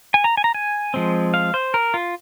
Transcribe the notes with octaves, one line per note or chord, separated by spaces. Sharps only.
G#5
A#5
G#5
A#5
G#5
F3 G#3 C4
F5
C5
A#4
F4